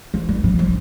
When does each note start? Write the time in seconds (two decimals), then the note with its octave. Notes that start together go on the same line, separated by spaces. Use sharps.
0.14 F3
0.29 G3
0.44 F3
0.59 F3